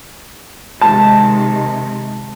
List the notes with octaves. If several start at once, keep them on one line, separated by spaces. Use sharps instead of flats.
C3 D#3 G#3 A5